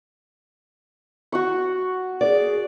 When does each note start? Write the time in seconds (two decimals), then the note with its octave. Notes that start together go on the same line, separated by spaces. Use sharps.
1.32 F#4 F#5 C#6
2.21 G#4 D5